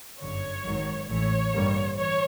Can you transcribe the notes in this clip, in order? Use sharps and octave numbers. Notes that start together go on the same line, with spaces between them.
G1 F#2 D3 C#5
G#1 G#2 D#3 F#3
A1 A2 E3 C#5
G2 D3 G3 A#3
E3 C#5